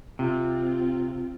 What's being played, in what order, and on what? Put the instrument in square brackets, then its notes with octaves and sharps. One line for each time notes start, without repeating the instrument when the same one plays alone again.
[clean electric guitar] C3 [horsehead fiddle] C4 F4